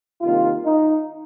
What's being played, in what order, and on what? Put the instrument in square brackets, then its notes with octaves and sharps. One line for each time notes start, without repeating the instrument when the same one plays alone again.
[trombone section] C2 C3 D#3 A#3 F4
D#4